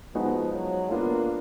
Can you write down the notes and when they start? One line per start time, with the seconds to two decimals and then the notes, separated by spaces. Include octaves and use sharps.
0.14 F3 G#3 B3 D#4 F#4
0.53 F#3
0.91 A#3 B3 D4 F4